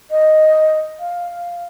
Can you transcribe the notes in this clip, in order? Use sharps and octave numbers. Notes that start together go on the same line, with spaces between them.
D#5
F5